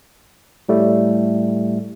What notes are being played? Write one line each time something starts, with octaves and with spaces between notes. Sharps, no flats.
A2 G3 A3